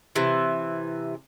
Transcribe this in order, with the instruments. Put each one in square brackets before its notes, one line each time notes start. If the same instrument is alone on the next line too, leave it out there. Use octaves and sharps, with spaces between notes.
[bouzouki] C3 E3